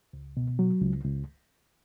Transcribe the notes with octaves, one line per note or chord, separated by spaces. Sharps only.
C#2
B2
F#3
C#2
C#2